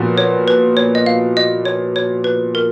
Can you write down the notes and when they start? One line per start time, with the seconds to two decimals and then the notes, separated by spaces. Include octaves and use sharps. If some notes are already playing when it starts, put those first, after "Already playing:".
Already playing: A#2 F3 B3 F#4
0.18 C#5
0.48 B4
0.77 C#5
0.95 D#5
1.06 F5
1.37 D#5
1.65 C#5
1.96 C#5
2.24 B4
2.55 A#4